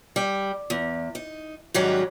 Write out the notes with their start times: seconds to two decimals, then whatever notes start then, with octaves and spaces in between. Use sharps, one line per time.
0.16 G3
0.70 E2
1.15 D#4
1.74 G#2 D#3 F#3 G3 C#4 G#4